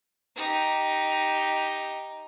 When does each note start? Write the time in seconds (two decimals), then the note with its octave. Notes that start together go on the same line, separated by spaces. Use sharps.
0.36 D#4 G4